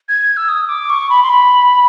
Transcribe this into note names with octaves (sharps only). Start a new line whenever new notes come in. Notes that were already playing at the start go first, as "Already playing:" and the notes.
G#6
E6
D#6
D6
C#6
B5
C6
B5